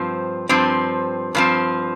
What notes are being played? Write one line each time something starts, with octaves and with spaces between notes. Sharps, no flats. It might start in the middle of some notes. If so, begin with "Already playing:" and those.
Already playing: G2 F3 C4
G2 F3 C4
G2 F3 C4